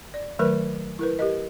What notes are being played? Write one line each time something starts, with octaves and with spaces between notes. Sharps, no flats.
D5
D#3 F#3 A3 A#4 B4
E4 A#4 B4
G4 A#4 D#5